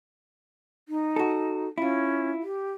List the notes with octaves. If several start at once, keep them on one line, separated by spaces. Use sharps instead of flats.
D#4
F#4 A4
C#4 E4 F4
G4